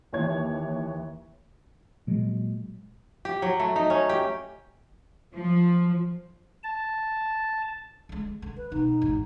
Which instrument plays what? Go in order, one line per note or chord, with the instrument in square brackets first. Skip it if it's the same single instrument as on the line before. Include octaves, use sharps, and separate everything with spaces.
[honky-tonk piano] D#2 E3 C#5 G#6
[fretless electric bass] A#2 F#3 G#3
[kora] G4
F#3
A3
D#4
C#4
G4
[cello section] F3
[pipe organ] A5
[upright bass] D3 G#3
D3
[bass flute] B4
[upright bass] B2 [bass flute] D#4
[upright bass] G#1 E2